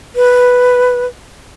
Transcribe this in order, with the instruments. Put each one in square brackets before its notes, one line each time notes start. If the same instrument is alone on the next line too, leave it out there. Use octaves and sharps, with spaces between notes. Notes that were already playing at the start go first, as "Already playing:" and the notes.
[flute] B4